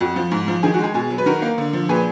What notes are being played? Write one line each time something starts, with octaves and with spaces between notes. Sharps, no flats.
F2 F#4
F3
G#2
F3
D#3 G#4
F#4
G#3 G#4
B2 G#4
F#3
B4
D#3 F#4 A#4
A#3
D3
F3
A#2 G#4 B4